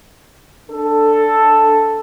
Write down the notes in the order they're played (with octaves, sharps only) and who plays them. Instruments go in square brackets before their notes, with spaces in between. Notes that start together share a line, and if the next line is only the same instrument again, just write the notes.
[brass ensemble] D4 A4